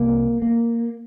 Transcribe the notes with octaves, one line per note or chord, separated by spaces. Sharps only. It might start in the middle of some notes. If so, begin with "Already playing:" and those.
Already playing: C2 C3 A#3
A#3